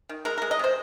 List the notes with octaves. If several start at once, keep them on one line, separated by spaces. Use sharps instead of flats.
D#3
G#3 A#4
G#3 A#4
D#5
C3 C5